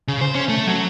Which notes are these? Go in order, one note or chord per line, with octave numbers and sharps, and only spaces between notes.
C#3
C5
C#4
A3
F#3